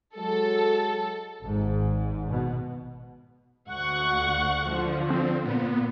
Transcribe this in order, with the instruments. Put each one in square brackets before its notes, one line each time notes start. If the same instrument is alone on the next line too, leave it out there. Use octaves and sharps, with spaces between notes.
[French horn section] F#3 G#3 [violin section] A4
[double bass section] G#1 G#2
B2
[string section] D2 F#5 C#6
D3 F3
[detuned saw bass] C4
[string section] A#2 [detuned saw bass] B3